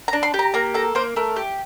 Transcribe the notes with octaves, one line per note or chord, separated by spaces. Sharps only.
A#5
D4
C6
G4
A#5
A#3 A#5
A4 A#5
A#3 C5
A3 A#4
G4